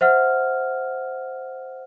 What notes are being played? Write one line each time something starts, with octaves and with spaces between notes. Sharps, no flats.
C5 E5 F#5 F6